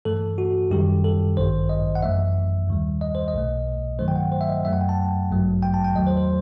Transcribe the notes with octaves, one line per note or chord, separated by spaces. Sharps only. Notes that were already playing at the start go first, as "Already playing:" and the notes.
G2 E3 A3 A4
F#4
F#2 D#3 G3 G4
A4
A1 G2 D#3 C5
D#5
F#5
F#2 E3 A3 E5
D#2 D#3 G3
D#5
C5
D#5
B1 B2 A3
G2 D#3 F#3 A3 C5
G5
F#5
C5
E5
D#5
F#2 F#3 A3 E5
F#5
G5
A5
A1 G2 F#3 A3
G5
A5
G5
E2 D#3 F#3 A3 D#5
C5
C5